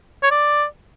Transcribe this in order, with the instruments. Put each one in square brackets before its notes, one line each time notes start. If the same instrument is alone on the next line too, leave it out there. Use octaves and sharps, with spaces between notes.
[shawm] C#5
D5